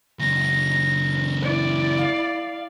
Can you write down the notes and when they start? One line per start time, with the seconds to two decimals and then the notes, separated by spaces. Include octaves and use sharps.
0.19 C#2 F#2 A#6
1.42 E4 D5
1.97 F5